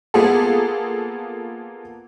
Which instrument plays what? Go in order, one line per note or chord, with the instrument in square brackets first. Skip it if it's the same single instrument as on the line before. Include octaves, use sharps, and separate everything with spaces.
[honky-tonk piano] A#3 B3 F4 G#4 A4